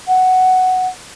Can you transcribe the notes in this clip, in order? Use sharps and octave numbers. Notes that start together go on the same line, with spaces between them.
F#5